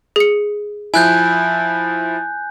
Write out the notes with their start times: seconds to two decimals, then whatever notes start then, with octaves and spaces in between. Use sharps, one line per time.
0.16 G#4 C#7
0.94 F3 E4 G#5 F#6 G6